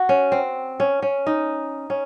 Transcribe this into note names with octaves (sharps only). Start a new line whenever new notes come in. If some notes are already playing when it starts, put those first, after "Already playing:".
Already playing: F#4
C#4
C4
C#4
C#4
D#4
C#4